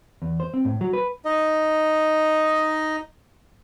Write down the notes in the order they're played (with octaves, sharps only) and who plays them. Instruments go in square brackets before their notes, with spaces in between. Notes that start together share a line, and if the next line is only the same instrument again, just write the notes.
[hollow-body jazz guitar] E2
C5
C4
A2
F#3
B4
[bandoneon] D#4 D#5